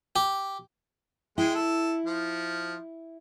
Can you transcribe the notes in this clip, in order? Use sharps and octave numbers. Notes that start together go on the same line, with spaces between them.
G4
G#3 E4 G5
A4
F3